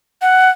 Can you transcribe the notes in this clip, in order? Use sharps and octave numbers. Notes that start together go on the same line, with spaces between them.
F#5